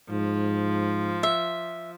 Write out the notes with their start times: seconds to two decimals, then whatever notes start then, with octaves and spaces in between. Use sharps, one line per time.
0.10 G#2 F3
1.23 E5